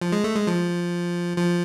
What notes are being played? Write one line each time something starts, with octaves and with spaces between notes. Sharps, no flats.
F3
G#3
A3
G#3
F3
F3